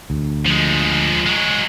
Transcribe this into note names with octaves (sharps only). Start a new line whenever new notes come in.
D2
F3 G#3
F#3 G#3